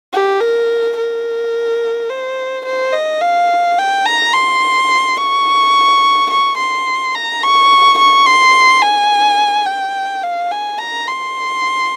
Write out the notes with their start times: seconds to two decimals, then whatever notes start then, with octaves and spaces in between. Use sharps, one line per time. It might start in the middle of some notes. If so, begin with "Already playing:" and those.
0.13 G4
0.40 A#4
0.97 A#4
2.10 C5
2.66 C5
2.93 D#5
3.21 F5
3.78 G5
4.06 A#5
4.34 C6
5.18 C#6
6.31 C#6
6.58 C6
7.15 A#5
7.43 C#6
7.98 C#6
8.26 C6
8.82 G#5
9.66 G5
10.23 F5
10.51 G#5
10.79 A#5
11.08 C6